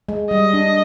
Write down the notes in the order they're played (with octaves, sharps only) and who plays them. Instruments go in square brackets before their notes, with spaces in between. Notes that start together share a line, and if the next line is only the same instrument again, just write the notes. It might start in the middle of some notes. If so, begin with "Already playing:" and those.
[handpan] G#3
[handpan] G3 [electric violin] D#5
[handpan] D4